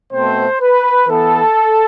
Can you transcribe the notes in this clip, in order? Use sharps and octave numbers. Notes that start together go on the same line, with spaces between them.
B2 A3 C4 C5
B4
E3 B3 A4